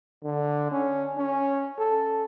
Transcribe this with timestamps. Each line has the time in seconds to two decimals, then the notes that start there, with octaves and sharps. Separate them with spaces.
0.23 D3
0.71 C#4
1.18 C#4
1.79 A4